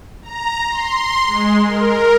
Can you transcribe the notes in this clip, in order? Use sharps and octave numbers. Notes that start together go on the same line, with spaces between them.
A#5
C6
G#3
A#4